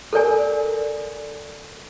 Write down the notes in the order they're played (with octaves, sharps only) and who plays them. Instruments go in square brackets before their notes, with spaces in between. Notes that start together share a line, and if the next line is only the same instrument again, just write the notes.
[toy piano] A4 A#4 D5 G#5